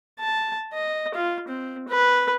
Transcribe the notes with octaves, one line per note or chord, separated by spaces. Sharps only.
A5
D#5
F4
C4
B4